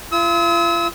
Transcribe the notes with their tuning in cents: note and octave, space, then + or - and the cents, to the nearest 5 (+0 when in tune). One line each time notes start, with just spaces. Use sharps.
F4 -40 E6 -40